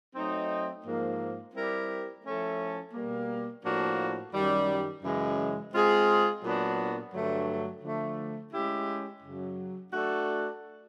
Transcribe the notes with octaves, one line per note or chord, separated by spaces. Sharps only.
F#3 A3 C4 D#4
G#2 F3 A#3
G3 C4 E4 G4 A#4
F3 A3 C#4 E4 A4
B2 G3 A#3
A2 F3 A#3 D4 F#4
F#2 D#3 G3
F#2 C#3 E3 G#3
G#3 C4 F4 G#4
A#2 F#3 B3 D4 F#4
G2 D3 F#3 A3
D3 F3 A3
G#3 C#4 E4 G4
F#2 C#3 F#3
A3 D4 F#4 A4 D5